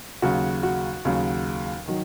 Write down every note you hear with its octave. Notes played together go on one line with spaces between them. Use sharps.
D#2 C#3 F#3 F#4
F#4
D#2 C#3 F#3
D#3 F#3